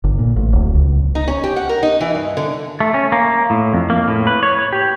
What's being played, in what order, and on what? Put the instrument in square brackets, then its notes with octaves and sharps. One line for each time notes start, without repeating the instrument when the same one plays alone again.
[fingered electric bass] G1
A#2
A1
D1
C#2
[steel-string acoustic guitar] D#4
C#4
G4
F#5
A#4
D#4
E3
G2
D3
[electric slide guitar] A3
C#4
A#3
A2
F2
A#3
A2
B4
C#5
C#5
G4